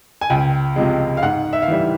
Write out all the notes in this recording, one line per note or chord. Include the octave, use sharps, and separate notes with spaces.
G#5
C#2 G5
C3 F3 G#3
F5
G#2 F#5
E5
F5
E3 G3 E5